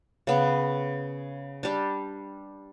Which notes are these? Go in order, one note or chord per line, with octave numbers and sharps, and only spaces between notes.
C#3 B3
G3 D4